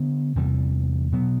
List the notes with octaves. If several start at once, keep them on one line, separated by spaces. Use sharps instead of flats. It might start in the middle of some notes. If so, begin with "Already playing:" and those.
Already playing: D3 B3 D4
E2 C3 E3 G3
B2 F#3 B3